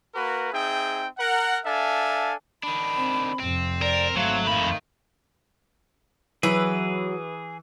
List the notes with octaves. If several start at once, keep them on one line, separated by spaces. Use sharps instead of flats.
A#3 F#4 A#4 B4
C4 D#4 G#4 E5 G5
A#4 F#5
D4 A4 E5 F5 G#5
D#3 D4 B5
C4
F1 F2 C4
A#4 D5
G#1 F#3 A3 F5
F2 D#3 F5 B5
E3 F#3 G#4 B4